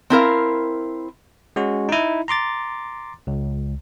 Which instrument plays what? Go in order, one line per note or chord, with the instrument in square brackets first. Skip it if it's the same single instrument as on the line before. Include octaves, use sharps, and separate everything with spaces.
[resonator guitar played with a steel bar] C4 E4 A#4 F5
[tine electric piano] G#3 C#4 F#4
D#4 E4
A#5 C6 D6 A6
C#2